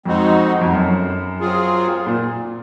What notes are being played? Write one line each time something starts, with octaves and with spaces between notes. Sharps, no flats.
F2 G#3 C4 D#4 F#4
F2
F#2
F#3 C4 F4 G#4
A#2